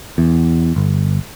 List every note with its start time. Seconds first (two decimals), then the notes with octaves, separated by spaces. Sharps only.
0.18 E2
0.76 G1